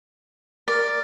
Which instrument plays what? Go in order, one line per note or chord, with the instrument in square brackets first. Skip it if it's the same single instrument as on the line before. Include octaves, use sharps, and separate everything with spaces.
[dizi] A#4 [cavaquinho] D5